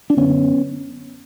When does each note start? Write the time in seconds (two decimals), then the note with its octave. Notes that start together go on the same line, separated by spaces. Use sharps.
0.10 D4
0.17 F#2 D3 B3 C#4